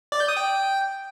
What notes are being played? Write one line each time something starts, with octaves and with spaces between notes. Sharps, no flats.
D5
G6
D#6
G5